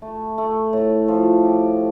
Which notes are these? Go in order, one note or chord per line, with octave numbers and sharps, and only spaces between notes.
A3
A3
A2
F3
G4